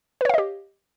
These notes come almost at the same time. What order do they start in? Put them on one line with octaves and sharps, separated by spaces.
B4 C#5 F5 D#5 G4